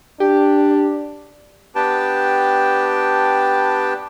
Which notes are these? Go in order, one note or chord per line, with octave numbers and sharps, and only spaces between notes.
D4 G4
B3 D4 G4 B4 G5 A5